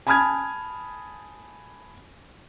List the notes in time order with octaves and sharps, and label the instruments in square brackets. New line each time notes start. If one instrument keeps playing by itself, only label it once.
[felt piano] G#5 A5 B5 D#6 F6 G#6